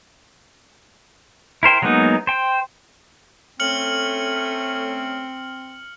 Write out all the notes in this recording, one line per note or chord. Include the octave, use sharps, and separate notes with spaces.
E4 A#4 C5 G5
F#3 G#3 A#3 B3 D#4
C5 G5
A3 C4 C#4 F6 C#7 F#7